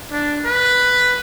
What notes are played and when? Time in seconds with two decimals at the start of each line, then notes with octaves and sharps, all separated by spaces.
0.12 D4
0.45 B4